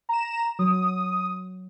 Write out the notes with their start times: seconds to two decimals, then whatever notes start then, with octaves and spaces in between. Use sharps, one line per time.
0.09 A#5 E7
0.59 F#3 D#6